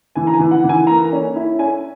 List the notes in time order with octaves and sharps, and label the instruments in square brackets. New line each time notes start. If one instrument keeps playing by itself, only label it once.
[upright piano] E3 G#5
A#5
G#5
E3
F#5
E3
G#5
A#3 A#5
C#4
E4
C#4 G#5